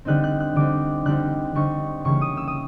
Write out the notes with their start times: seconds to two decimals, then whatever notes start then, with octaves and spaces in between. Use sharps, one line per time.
0.05 D3 G3 C4 D#4 F#6
0.24 F#6
0.40 F#6
0.56 D3 G3 C4 D#4 D6
1.05 D3 G3 C4 D#4 F#6
1.55 D3 G3 C4 D#4 C#6
2.05 C#3 E3 G3 A#3 C#6
2.21 D#6
2.37 E6
2.48 D#6